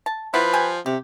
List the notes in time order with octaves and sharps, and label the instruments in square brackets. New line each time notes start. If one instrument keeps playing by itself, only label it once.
[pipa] A5
[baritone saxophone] F3 [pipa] E4 [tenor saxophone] B4
[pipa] G3 G4 G#5
[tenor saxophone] C3 [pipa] G4